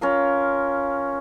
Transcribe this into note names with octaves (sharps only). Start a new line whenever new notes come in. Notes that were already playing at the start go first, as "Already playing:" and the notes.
C#4 F4 A#4 F5